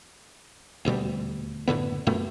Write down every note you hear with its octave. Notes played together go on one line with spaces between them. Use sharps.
D#1 D2 B2 G3
F#1 A2 D3 B3
F#2 A#2 A3 B3